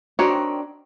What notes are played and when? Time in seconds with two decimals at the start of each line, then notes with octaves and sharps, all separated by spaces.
0.19 D#3 C4 D4 F#4 C#5